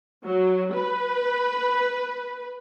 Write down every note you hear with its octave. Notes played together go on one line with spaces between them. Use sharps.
F#3
B4